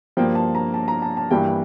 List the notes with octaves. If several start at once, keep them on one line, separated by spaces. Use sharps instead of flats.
G2 F3 A#3 G5
A5
A#5
A5
A#5
A5
A5
G2 E3 G3 A#3 G5